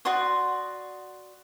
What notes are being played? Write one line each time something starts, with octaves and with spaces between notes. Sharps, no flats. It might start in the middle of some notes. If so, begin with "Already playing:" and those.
F#4 D5 C6 D#6